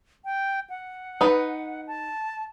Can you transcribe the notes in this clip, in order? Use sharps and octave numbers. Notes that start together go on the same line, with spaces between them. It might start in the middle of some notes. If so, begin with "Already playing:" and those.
G5
F#5
D#4 B4
A5